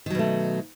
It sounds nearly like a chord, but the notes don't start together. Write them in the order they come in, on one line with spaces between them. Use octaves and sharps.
D#3 F#3 B2 A3